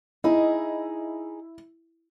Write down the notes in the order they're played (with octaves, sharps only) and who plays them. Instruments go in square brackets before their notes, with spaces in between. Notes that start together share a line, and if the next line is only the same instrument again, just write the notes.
[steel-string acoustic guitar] D#4 G#4 D#5 [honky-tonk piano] E4